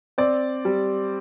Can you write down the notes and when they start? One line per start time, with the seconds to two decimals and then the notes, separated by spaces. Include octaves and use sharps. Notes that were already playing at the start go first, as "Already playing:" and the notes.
0.18 C4 D5
0.65 G3